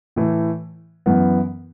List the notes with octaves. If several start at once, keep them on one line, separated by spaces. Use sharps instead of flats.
A2 E3 A3
F#2 E3 B3